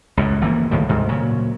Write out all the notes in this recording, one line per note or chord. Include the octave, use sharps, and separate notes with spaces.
C#2 F#2 A2
G1 E3 F3 A#3
C#2 A2 D#3 G3
D2 G#2 C3
A#2 C#3 F#3